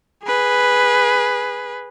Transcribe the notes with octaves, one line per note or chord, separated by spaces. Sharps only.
G#4 B4